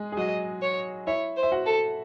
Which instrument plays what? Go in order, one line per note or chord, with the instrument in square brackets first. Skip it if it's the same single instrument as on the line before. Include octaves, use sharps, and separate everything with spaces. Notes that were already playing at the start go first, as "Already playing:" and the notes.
Already playing: [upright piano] G#3 G#4
G#4
[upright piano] F#3 F#4 [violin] D#5
[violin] C#5
[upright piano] E4 E5 [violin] C#5
[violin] C5
[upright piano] E5
F#4 F#5
[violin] A4